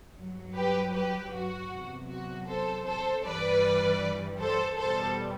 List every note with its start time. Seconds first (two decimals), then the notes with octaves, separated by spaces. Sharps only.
0.16 G2 F#3
0.55 G4 B4
0.93 G4 B4
1.32 F#4
1.70 E2 C3 F#3
2.09 F#4
2.47 A4 C5
2.86 A4 C5
3.24 G2 E3 G3 B4 D5
4.40 A4 C5
4.78 E2 B2 G3 A4 C5